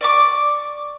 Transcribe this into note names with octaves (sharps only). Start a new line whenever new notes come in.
D5 C#6 D6